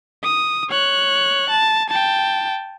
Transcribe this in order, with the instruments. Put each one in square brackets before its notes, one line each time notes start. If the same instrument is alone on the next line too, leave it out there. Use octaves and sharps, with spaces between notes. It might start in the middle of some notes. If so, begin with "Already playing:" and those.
[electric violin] D#6
C#5 F#6
A5
G5 A5